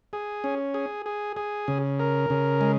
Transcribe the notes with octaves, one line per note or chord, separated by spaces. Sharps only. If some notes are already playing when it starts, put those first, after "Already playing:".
G#4
C#4
G#4
G#4
G#4
C#3
A#4
C#3
G#3